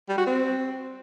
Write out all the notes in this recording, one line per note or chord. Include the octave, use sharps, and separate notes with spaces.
G3
F#4
C4